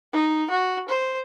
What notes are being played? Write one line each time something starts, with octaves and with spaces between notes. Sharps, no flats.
D#4
F#4
C5